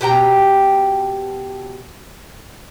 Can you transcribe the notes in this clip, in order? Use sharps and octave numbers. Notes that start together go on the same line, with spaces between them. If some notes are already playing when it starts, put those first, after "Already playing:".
B2 G4 G5 A#5